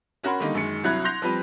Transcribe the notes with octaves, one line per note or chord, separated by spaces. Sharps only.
C#4 F#4 A#4 F#5 B5 C6
D3 D#3 G3 A#3 D#4
F#2 D#3 G#3 C#7
C2 F#3 E4 B5 F#6 G#6
C6 F#6 G6 A#6 F7
F3 G3 C4 B4